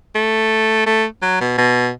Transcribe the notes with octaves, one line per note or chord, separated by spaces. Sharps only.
A3
A3
F#3
B2
B2